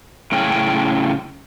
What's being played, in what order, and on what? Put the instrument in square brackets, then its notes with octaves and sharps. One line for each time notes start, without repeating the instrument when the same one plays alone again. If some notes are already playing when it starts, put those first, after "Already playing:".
[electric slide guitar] A2 C#3 C#4 G5